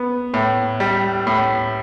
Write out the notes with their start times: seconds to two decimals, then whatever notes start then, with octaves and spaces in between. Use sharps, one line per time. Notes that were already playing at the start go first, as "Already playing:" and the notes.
Already playing: B3
0.34 A2
0.80 G3
1.27 A2